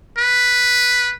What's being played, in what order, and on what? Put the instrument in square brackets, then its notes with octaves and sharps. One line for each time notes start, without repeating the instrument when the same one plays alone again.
[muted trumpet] B4